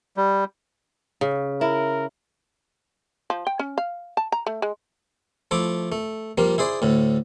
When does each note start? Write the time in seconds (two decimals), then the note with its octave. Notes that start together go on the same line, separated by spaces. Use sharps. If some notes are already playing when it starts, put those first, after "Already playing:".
0.17 G3
1.21 C#3
1.61 E4 A#4
3.30 F3
3.47 G5
3.59 C#4
3.78 F5
4.17 A5
4.32 A#5
4.47 A3
4.62 G#3
5.51 F3 A3 E4 D6
5.92 A3
6.38 F3 G3 A#3
6.58 E4 G#4 C5 D5
6.82 D2 A2